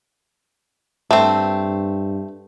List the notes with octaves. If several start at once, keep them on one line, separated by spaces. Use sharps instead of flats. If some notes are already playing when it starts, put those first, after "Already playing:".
G2 A3 C4